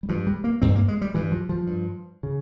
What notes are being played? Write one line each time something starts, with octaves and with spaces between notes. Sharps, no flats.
G3
G2 F3
G3
A#3
G2 C4
A#3
G#3
G3
G2 E3
F3
F3
G2
C#3